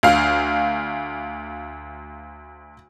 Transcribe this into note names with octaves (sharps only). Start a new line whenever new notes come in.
D2 F5